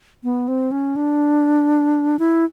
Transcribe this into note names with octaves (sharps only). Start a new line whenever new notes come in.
B3
C4
C#4
D4
E4